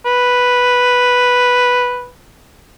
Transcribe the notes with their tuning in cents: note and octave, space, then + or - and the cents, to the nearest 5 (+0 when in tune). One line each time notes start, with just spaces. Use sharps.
B4 +0